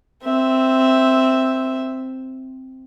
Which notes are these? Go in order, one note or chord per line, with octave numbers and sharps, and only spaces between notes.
C4 E5